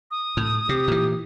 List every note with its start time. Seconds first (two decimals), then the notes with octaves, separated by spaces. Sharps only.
0.11 D#6
0.37 A2
0.69 C3 G4
0.88 A#2 E3